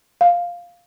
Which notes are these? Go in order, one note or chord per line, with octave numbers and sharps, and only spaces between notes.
F5